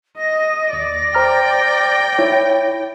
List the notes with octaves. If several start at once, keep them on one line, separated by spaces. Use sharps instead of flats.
D#5 A#6
D#2 D5
C5 G5 A#5 F6
E4 C#5